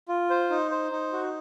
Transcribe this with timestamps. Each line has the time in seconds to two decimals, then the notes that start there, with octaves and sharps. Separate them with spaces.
0.08 F4
0.30 C5
0.50 D#4
0.71 C5
0.92 D#4
1.13 F#4